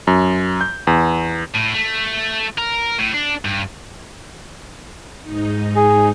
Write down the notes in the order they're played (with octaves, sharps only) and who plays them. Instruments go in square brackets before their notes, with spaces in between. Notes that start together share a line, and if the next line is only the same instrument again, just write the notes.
[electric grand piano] F#2
G6
E2
[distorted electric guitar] A2
A3
A#4
A2
D4
G2
[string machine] G#2 D#4
[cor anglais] G#4